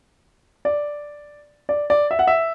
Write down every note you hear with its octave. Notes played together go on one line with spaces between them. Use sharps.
D5
D5
D5
E5
F#5
E5